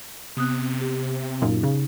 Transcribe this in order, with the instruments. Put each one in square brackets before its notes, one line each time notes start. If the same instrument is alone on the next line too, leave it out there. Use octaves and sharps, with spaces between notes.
[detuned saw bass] C3 [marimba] B3 D#6 F#6
[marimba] G4
[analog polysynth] F#2 A#2 [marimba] D#4
[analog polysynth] C#3